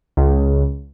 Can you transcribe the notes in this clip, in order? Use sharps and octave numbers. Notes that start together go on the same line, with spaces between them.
C#2